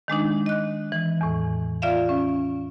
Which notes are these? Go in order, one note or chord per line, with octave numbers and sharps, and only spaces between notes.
D#3 G#3 D4 D#4
D#5 F#6
E3
E2 A2
F4 D5 E5 F5
C#4